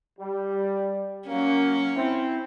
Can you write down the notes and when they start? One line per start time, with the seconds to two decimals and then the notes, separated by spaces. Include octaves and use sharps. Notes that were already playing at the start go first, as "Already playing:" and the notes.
0.18 G3
1.28 F#3 A#3 C#4
1.96 C4 E4